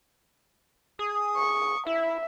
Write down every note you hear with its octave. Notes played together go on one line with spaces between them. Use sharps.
G#4 D#6
C#6
E4 E5